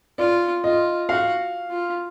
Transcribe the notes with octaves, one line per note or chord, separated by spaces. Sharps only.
F4 D5
F4 D#5
F#4 F5
F4